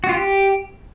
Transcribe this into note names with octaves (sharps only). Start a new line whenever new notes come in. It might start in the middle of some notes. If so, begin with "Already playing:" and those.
F#4
F4
G4